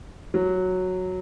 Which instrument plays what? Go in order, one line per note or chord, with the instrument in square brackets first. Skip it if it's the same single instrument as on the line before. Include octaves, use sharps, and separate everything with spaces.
[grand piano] F#3